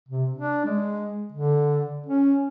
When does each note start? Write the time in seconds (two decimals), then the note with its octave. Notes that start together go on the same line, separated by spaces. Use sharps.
0.09 C3
0.34 D4
0.65 G#3
1.32 D3
2.06 C#4